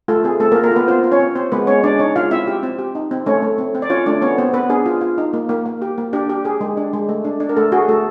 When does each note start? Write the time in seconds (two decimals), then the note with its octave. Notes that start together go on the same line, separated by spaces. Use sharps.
0.08 A3 F4 A4
0.24 C4 G#4
0.40 A3 C4 A4
0.52 A#3 A#4
0.56 F4
0.64 A#3 A#4
0.72 B3 F4 B4
0.88 C4 F4 C5
1.04 F4
1.11 C#4 C#5
1.20 C4
1.35 C4 C5
1.52 G#3 B3 B4
1.67 G#3 C#4 C#5
1.84 G#3 D4 D5
1.99 C#4 D#4 C#5
2.16 G#3 F4 F5
2.31 C4 E4 E5
2.47 G4
2.63 C4
2.78 G4
2.95 D#4
3.11 C4
3.26 A3 C#4 C#5
3.42 A3
3.58 C4
3.75 C4
3.82 D5
3.90 C#4 F4 C#5
4.06 A3 D4 D5
4.22 B3 C#4 C#5
4.38 B3 C4 C5
4.53 B3 B4
4.69 D4 G#4
4.86 F4
5.01 F4
5.18 D#4
5.33 A#3
5.49 A#3
5.66 A#3
5.82 G4
5.98 A#3
6.13 D4 G4
6.30 G4
6.45 G4 G#4
6.61 G#3
6.77 D4
6.93 G#3
7.09 A3
7.25 D4
7.40 D4
7.49 A#4
7.56 A3 A4
7.72 F#4 G#4
7.88 A3 A4